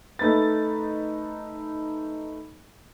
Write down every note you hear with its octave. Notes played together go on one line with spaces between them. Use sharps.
A3 D#4 B4 A6